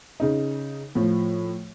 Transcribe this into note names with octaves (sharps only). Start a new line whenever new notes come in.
C#3 D#4
A2 F3